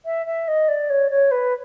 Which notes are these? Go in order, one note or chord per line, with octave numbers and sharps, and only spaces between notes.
E5
E5
D#5
D5
C#5
C#5
B4